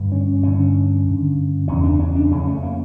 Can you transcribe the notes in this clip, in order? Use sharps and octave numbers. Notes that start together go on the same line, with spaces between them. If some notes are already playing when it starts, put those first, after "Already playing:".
Already playing: G2 D3
C#4
G2 D3 C#4
G2 D3
E2 C#3 C#4
D4
C#4
D4
F2 C#3 C#4
A3
A#3